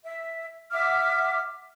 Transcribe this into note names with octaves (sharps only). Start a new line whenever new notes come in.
E5
E5 F#5 D6 F6